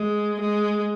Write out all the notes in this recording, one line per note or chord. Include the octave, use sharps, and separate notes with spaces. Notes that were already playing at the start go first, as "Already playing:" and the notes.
Already playing: G#3
G#3